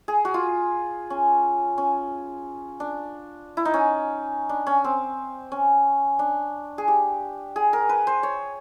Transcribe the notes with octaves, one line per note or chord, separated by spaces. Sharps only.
G#4
F#4
F4
C#4
C#4
D4
E4
D#4
C#4
D4
C#4
C4
C#4
D4
G#4
G4
G#4
A#4
B4
C5
C#5